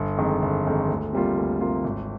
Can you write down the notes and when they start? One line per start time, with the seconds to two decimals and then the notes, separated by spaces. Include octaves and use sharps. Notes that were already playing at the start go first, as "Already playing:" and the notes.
Already playing: G1
0.17 F2 D#3 G#3
0.42 G1
0.65 F2 D#3 G#3
0.89 D2
1.13 C3 G3 A#3 F4
1.36 D2
1.61 C3 G3 A#3 F4
1.84 G#1